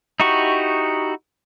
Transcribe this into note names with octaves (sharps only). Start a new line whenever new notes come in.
D#4 E4 F#4 G4 C#6